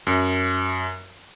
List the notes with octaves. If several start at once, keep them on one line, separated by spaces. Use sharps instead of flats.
F#2